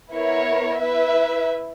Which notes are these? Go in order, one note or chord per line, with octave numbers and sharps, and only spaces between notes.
B3 E4 A#4 C#5
E4 B4 E5